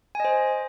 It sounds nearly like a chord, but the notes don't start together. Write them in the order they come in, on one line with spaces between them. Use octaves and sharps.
G#5 D#5 C5